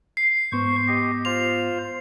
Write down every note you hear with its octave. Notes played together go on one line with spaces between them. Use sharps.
C7
G#2 B3 C5 C#6
G4 D#5
F4 C5 F7